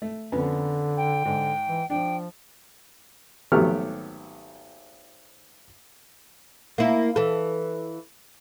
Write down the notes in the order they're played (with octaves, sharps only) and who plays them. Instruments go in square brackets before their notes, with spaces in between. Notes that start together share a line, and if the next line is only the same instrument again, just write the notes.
[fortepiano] A3
[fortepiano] F2 B3 C#4 [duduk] D3
[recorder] G5
[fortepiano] G#2 [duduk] D3
[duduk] E3
[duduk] F3 [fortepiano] D4 [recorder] G5
[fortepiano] G#1 F#3 A3 B3 G4 F6
[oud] A#3 E4
E3 A4